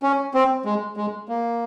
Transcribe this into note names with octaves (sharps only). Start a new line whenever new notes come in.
C#4
C4
G#3
G#3
A#3